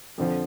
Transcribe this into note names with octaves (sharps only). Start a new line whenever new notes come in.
F2 D3 F3